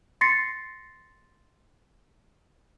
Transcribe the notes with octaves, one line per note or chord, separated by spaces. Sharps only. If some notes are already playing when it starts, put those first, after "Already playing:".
C6 A6 A#6 C7 C#7